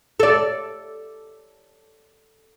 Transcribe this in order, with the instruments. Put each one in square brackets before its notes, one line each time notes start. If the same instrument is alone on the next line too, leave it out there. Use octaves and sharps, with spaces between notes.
[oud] A4 D5